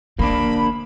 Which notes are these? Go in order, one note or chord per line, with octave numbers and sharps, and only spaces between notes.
D3 A#3 D4 B5